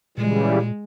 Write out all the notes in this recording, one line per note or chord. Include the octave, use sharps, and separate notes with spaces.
A#2 C#3 E3 G3 G#3